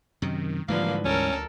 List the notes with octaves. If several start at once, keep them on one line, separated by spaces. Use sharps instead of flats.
F#2 C3 D#3
G#2 D3 E3 F3 G3 A#3 B4 F5
D2 C#4 A4 A#4